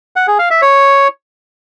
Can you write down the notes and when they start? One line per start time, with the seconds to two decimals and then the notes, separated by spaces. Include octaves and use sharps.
0.16 F#5
0.27 G#4
0.39 F5
0.50 E5
0.62 C#5